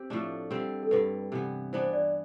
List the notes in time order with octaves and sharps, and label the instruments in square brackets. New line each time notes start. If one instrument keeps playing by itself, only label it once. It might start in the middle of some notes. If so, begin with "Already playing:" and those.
Already playing: [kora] C4 G4
A2 F3 A3 D4
D3 G3 C4
[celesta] A4
[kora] G2 D3 G3 [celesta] B4
[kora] C3 E3 B3
[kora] E3 B3 D4 [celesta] C5
[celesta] D5